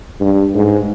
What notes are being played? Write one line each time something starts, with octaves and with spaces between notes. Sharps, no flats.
G2
G#2